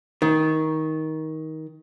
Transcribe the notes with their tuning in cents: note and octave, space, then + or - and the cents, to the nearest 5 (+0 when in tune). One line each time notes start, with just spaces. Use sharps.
D#3 +20